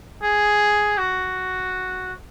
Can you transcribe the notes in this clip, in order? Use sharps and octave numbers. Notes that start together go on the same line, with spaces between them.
G#4
F#4